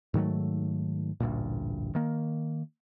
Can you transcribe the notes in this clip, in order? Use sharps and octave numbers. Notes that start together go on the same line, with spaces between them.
G#2 D#3 F#3 A3
A1 D2 G2 A#2
D#3 A#3